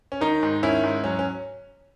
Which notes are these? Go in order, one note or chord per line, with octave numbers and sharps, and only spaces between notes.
C#4
D#3 D#4
G#2
D#3 C#4 E4
G#2
F#3 C#4
C#4